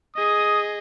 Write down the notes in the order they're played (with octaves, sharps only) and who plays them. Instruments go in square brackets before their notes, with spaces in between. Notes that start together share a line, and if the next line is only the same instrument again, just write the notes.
[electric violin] G#4 D#5 [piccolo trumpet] D#6